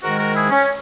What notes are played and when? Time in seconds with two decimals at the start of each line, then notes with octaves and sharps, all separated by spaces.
0.02 G#2 D#3 G#3 F#4 A#4
0.18 F#4 A#4
0.34 E4 G#4
0.50 C#4